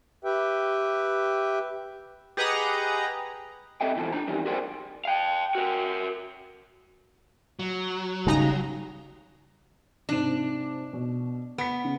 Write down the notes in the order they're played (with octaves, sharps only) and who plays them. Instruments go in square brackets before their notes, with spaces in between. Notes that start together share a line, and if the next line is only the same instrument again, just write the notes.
[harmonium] G4 B4 E5 G5
[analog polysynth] G4 G#4 B4 D#5 F#5 A#5
[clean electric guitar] C4 A4 D#5 E5 G5
B2 E3 F3 A4
D4 A#5
F2 D#3 E3 G3
F#4 G#4 A#4 C5 D5 G5
[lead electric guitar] F5 G5
F#4 A#4
F#3
[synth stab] G#1 D#4 A#5 [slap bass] C#3 G3
[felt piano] G#2 C3 E7 [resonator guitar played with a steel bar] D4
[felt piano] B2
[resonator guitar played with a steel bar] B3 [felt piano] B6 C#7 D7
[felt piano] C#3